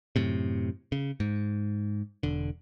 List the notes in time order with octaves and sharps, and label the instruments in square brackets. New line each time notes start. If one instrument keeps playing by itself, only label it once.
[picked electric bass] F#2 A2 C3
C#3
G#2
E1 D3